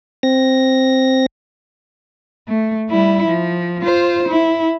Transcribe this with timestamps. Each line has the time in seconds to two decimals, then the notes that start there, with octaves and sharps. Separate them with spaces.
0.23 C4 A#6
2.48 A3
2.89 G3 E4
3.27 F3
3.82 F4 C5
4.28 E4